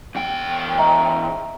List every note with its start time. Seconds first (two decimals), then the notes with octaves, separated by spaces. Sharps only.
0.15 E2 G5
0.78 D#5 E5 A#5